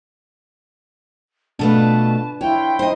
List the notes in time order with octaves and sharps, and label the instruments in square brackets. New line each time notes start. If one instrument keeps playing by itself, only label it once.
[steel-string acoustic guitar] B2 A3 F4 [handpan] D4 B4 [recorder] A5
[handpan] E4 F4 [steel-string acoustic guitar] C#5 [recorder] G5
[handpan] D#4 [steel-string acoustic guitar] C5 D#5